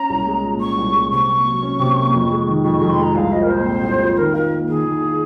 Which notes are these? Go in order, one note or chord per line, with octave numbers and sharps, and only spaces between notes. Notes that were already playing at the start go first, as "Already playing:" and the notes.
Already playing: C#4 A#5
C2
G#3
A#2
C#4 C#6
C2
G#3
C3 C#6
A#3
F#3
C#4
C3
A#3
F2
G#3
D#3
F2 C#6
F2 C#6
C6
G#3 A#5
C2 F5
F3 D#5
A#4
A#2 C5
C4
C2
F3
D#3 A#4
F4 A#4
A#3
D#3 G#4
D#3
F4